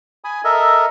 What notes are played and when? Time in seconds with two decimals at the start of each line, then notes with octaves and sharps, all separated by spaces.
0.24 G#5 B5 D#6
0.45 A4 A#4 D#5 E5